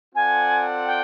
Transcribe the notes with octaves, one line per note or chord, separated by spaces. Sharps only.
C4 F4 A4 D5 F#5 G#5
G5